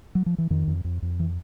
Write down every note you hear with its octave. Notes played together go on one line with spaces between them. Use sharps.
F#3
F3
E3
F2 D#3
F2
F2
F2
E3